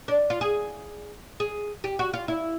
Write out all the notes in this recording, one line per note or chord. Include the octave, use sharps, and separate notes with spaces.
D4
F4
G#4
G#4
G4
F#4
F4
E4